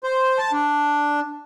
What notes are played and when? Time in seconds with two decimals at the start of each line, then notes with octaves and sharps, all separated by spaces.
0.04 C5
0.38 A5
0.53 D4